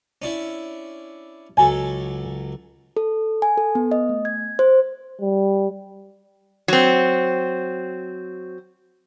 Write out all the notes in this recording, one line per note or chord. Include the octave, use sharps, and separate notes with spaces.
C#4 D4 E4
C#2 F#3 A4 G#5
A4
G#5
A4
B3
D#5
A3
G#6
C5
G3
F#3 C4